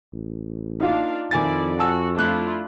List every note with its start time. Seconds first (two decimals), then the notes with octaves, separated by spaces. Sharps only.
0.13 A1
0.80 A#3 D4 D#4 F4 F5
1.31 F2 D#3 F3 E4 D5 G#5 A6
1.79 F#4 G#5 A5 E6
2.17 A3 D4 E4 F4 F#6